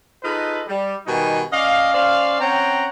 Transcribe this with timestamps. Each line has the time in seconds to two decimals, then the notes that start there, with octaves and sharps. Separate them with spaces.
0.23 D#4 F4 G#4 A4 B4 D#5
0.68 G3
1.06 B2 D#3 G3 B3 D#4 G#5
1.52 C#4 D5 D#5 F5
1.94 C#4 C5 D5 F5
2.40 C4 C#4 C#5 F#5 G5 A#5